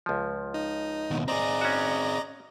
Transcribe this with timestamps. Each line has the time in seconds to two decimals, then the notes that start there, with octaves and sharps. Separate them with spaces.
0.06 C#2 F3
0.54 D#4
1.11 D#2 B2
1.28 C4 G#4 D5 D#5 A#5
1.61 C#4 F#4